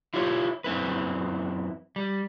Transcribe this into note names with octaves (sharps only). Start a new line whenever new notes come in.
E4 F4 G4 C#5
F#2 C4 E4 B4
G3